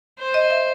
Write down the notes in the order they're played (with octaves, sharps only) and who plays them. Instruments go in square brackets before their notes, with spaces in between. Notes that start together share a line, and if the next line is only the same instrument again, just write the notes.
[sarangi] C5
[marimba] D#5
E5